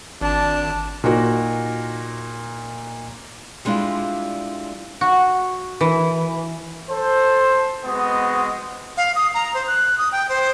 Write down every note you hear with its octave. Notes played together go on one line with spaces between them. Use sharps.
G#1 D4 A5
A#2 D#4 F#4 A#4
G3 G#3 D4 E4 F4
F#4
E3
A4 C5
G#3 B3 C4 F#4 D#5
F5
D#6
A#5
C5
F#6
D#6
G5
C5